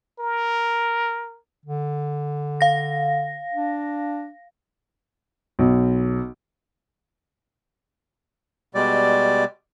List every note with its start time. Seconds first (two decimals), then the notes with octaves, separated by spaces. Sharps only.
0.19 A#4
1.66 D3
2.61 F5 A#6
3.54 D4
5.59 B1
8.75 B2 G3 G#3 D5